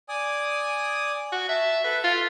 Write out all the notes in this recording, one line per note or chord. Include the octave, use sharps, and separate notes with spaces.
D5 G#5 D#6
F#4
E5 A5
A4 B4
F4